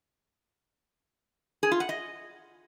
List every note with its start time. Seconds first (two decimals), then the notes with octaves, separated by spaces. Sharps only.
1.63 G#4
1.72 F4
1.80 F#5
1.89 D#5